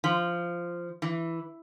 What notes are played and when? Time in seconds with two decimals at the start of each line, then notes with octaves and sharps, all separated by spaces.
0.04 F3
1.02 E3